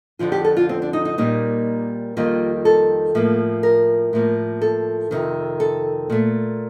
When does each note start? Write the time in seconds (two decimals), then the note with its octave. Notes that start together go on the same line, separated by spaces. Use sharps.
0.19 F2 D3 F3 F4
0.32 G4
0.45 A4
0.57 F4
0.69 C4
0.82 D4
0.93 D#4
1.05 D#4
1.18 A#2 G3 A#3 D#4
2.17 F2 D#3 G3 A#3 F4
2.65 A4
3.15 A2 F3 A#3
3.63 A#4
4.13 A2 F3 A#3
4.61 A4
5.11 F2 C3 D#3
5.60 A4
6.10 A#2 A3